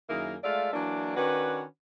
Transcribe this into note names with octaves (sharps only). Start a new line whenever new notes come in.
F#2 D#3 A#3 E4 G#4 A#4
G#3 A3 F4 D5 E5 F5
E3 F#3 A#3 D4
D#3 C#4 D4 F#4 B4